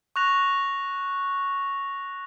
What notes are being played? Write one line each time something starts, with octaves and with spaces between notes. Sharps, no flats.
C#6 F#6 A#6 F7